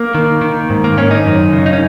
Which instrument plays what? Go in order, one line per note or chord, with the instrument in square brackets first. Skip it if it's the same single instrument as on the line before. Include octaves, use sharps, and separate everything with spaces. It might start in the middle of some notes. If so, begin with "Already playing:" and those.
Already playing: [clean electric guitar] A#3
D#3
D#3
G#2
A#3
D#3 C#4
D#4
F#2
C#3
D#4
C#4